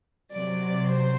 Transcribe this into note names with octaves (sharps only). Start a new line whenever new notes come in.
C3 F#3 D5
C5